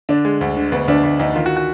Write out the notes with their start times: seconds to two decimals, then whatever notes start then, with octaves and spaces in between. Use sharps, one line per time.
0.09 D3 D4
0.25 G#3
0.41 D2
0.57 D3
0.72 D2 B3
0.88 D2 D4
1.03 D2
1.19 D2 D#4
1.35 D#3 F4
1.46 F#4
1.56 F#4